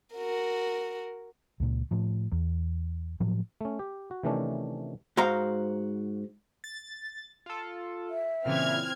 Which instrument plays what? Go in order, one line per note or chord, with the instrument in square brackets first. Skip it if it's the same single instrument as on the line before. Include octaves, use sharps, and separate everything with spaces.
[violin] F#4 A#4
[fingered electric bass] C#2 A#2
A2 F3
E2
A2 F3 F#3
[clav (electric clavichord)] A3 C#4
G4
F#4
C3 D#3 E3 A3 C#4 D4
[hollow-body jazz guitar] G#2 F#4 C5 F5 A#5
[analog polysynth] A6
F4 A4
[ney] E5
[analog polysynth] A#2 C#3 E3 [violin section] C4 F6 G#6